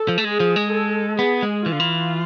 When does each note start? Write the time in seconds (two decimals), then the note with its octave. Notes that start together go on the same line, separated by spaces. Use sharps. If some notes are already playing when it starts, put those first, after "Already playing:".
Already playing: A4
0.08 F3
0.18 A3
0.25 G#3 G#4
0.40 F3
0.56 G#3
0.72 A4
1.19 B3 G#4
1.43 G#3
1.65 E3 F4
1.72 D3
1.80 E3